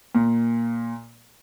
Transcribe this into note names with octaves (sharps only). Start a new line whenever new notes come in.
A#2